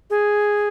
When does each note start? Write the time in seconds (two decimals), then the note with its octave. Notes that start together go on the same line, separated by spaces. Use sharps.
0.10 G#4